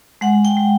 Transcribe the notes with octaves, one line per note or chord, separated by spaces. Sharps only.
G#3 F#5
G5
G#3